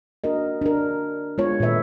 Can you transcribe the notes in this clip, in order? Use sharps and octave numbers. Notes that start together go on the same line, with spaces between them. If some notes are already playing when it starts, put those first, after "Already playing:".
D4 F#4 A#4 D#5
D4 A#4
G#3 B3 F4 C#5
A#2 D#3 A4 B4 E5